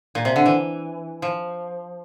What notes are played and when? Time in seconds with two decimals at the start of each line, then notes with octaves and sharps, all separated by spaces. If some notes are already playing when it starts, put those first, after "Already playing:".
0.15 A#2
0.25 C3
0.36 D3
0.46 E3
1.22 F3